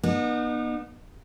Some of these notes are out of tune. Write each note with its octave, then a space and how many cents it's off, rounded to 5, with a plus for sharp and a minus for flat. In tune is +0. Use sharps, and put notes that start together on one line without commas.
B3 -35 D#4 -30